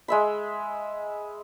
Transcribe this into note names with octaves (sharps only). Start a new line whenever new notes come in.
G#3 E5 B5